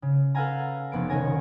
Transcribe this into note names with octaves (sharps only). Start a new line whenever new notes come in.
C#3
A4 B4 F5 F#5 G#5 A#5
F1 B3 D7
C2 D#3 C#4 C#5 G#5 A#6